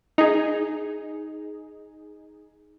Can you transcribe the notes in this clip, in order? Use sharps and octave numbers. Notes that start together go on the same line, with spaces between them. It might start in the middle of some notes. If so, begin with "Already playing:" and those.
D#4 G#4